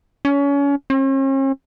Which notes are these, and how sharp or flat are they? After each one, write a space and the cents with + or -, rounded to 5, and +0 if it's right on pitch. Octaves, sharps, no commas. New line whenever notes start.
C#4 +30
C#4 -45